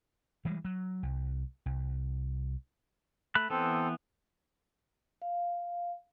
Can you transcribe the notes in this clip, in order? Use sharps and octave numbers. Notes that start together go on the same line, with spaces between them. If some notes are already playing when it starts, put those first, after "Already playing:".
E3 G3 G#3
F#3
C2
C2
A3 B5 F#6
E3 B3 C4 A4
F5